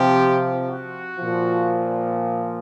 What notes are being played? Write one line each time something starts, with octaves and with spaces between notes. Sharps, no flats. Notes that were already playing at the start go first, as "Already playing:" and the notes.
Already playing: C3 F3 G4
F#4
A#2 F3